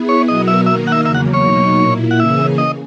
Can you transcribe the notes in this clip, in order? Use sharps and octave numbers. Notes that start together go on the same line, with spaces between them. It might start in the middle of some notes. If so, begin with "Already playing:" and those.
Already playing: B3 E4 G#4
C#5
B2 F#3 B3 F#4 A#4 D#5
E5
D#3 A#3 D#4 A#4 E5
F#5
E5
E2 C#3 F#3 A#3 E5
F#5
C#5
B2 F#3 A#3 D#4
A#2 A#3 E4
F#5
C#3 E3 A#3 C#4 G#4 E5
D#5